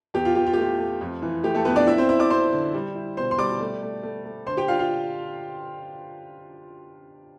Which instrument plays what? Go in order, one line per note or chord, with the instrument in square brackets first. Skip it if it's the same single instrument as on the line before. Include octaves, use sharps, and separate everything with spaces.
[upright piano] E2 G4
F4
E2 G4
F4
G4
A3 F4
A3
F2
E3
A3 G4
A3 A4
F2 B3 B4
D4 D5
C4 E4 E5
C4 C5
C4 E4 E5
D5 D6
C4 C5 C6
D3
G3
E4
B2 C5 C6
C6
G3 D5 D6
A3
A3
A3
A3
D3 C5 C6
G4 G5
D4 F4 F5
F4 F5